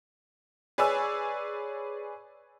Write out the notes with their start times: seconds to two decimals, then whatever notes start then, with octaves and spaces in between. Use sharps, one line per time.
0.78 G#4 B4 C#5 D5 G#5 E6